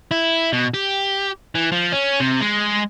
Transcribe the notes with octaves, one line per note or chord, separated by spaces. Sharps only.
E4
B2
G4
E3
F3
C#4
C3
G#3